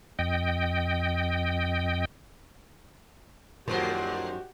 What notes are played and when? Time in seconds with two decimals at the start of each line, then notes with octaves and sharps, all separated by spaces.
0.19 F2 D#5 G5
3.68 F#2 A#2 D#3 F3 A3 F#4 G4 C5